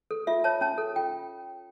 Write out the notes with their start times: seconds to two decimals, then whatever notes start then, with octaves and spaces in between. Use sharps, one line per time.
0.11 A4
0.27 F4 E5
0.44 C#5 A5
0.61 C#4 A5
0.78 A4
0.96 F4 G5